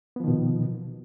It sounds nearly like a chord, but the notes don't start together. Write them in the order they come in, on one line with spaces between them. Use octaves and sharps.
B3 F3 D#3 B2